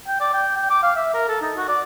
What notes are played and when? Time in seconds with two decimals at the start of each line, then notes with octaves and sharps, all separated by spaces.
0.07 G5
0.20 D5
0.33 G5
0.56 G5
0.70 D6
0.83 F5
0.96 E5
1.14 A#4
1.28 A4
1.41 D#4
1.57 F#4
1.68 D5